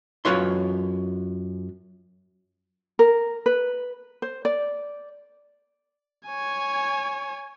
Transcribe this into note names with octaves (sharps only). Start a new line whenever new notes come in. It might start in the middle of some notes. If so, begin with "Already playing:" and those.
F#2 F3 F4 B4 C#5 C6
A#4
B4
C5
D5
C#5 G#5